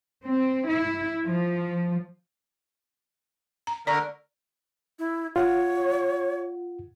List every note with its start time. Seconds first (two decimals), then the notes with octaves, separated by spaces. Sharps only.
0.25 C4
0.68 E4
1.26 F3
3.67 A#5
3.87 D3 A#4 D5 A#5 C#6
4.99 E4
5.36 F4 C#5 F#5